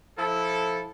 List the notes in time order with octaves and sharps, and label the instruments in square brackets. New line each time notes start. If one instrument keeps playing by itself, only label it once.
[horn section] F3 E4 A4